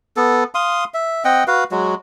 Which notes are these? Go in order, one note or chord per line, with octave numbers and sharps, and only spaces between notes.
B3 A4
F5 C6 D#6
E5
C4 D#5 F#5 G5
F#4 B4 F5
F#3 G#3 F#4